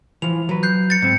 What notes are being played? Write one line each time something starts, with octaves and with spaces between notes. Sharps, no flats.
E3 F3 F7
F#3 B4
F#6 G6 C7
A6 C#7
G#2 C4